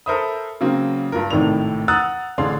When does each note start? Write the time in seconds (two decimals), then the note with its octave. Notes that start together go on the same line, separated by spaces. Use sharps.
0.06 A4 A#4 C5 E5 B5 D#6
0.61 C#3 F#3 A#3 C4
1.12 G2 F4 A#4
1.30 G#1 A2 C3 D#3 D5 F7
1.88 F#5 A#5 D#6 E6 F#6 A6
2.38 A1 D3 D4 G#4 F5 C6